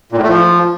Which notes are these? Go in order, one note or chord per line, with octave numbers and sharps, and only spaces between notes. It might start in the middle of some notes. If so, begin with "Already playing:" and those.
A#2
A2
A3
F3